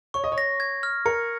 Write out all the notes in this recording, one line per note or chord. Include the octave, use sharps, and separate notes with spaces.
C#5 C#6
D#5
C#5
A#6
G#6
F6
A#4 C#7